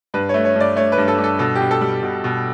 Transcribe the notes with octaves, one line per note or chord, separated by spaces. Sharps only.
G2 B4
A3 C#5
C#5
G2
D5
A3 C#5
B4
G2
A4
G2
A4
B2 A4
G4
B2
A4
G3
B2
B2